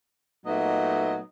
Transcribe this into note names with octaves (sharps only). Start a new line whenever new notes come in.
A#2 F#3 A3 B3 D#4 D#5